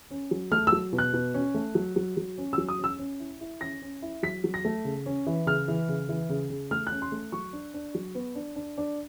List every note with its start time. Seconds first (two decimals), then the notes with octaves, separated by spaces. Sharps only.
0.11 C#4
0.31 F#3
0.52 A3 F6
0.67 E6
0.72 F#3
0.93 B2
0.98 F#6
1.13 B2
1.34 C#4
1.55 A3
1.75 F#3
1.96 F#3
2.17 F#3
2.38 C#4
2.53 F#3 E6
2.68 D#6
2.79 C#4
2.84 E6
2.99 C#4
3.20 E4
3.41 E4
3.61 C#4 A#6
3.82 C#4
4.02 E4
4.23 F#3 B6
4.44 F#3
4.54 A#6
4.65 A3
4.85 C#3
5.06 C#4
5.27 E3
5.46 C#3 F6
5.68 E3
5.89 C#3
6.09 E3
6.29 C#3
6.50 C#3
6.71 A3 F6
6.87 C#4 F#6
7.02 C6
7.12 A3
7.32 F#3 C#6
7.53 D4
7.74 D4
7.95 F#3
8.15 B3
8.35 D4
8.56 D4
8.77 D4